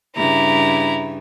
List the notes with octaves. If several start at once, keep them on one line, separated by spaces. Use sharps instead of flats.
G2 C#3 E4 A#5